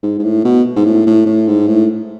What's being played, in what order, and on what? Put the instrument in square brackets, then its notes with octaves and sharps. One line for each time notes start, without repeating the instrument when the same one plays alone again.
[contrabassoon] G#2
G#2
A2
B2
G#2
A2
A2
A2
G#2
A2